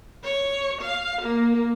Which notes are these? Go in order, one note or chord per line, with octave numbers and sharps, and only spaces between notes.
C#5
F5
A#3